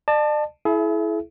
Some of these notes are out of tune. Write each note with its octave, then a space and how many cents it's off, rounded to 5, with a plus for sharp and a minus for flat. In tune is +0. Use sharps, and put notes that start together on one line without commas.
D5 +40 A5 +0
E4 +0 G#4 +45 E5 +25